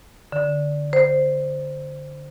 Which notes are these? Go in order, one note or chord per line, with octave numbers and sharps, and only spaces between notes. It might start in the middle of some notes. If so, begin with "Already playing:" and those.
D3
C5